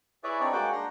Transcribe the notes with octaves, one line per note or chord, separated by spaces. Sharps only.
E4 G#4 B4 C#5 D5 E5
C4 D4 D#4 C#5 D5
G#3 A#3 F#4 F#5 G5 D6
D4 A#5 C6